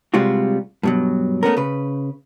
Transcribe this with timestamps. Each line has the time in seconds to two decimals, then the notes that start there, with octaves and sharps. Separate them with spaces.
0.14 C3 G3 G#3 F4 F#4
0.83 G2 B2 F#3
1.43 A3 B3 C#4 A#4
1.57 C#3 B4